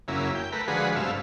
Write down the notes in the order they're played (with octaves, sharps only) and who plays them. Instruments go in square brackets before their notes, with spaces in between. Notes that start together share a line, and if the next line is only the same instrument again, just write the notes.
[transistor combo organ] F#2 C#3 A#3 E4
G5
A3 A#4 B4
D3 F3 G#3 F#4 G#4 B4
G2 C3 A3 E5 F5